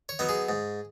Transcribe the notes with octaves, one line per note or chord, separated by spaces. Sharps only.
C#5
F#3 B3 D#4
G#4
G#2